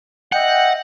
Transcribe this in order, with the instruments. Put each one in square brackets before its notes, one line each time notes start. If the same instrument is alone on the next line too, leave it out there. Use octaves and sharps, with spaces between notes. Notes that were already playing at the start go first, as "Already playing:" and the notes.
[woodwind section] D#5 E5 G5 [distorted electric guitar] F#5